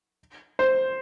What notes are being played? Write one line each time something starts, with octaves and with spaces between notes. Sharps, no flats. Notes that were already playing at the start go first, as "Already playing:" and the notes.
C5